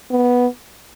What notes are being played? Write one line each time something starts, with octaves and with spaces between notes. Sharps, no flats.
B3